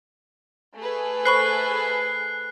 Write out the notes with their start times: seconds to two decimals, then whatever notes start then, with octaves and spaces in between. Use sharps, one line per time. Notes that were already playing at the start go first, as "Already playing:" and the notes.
0.76 A3 G#4 B4
1.25 C5 B5 C#6 F#6 C7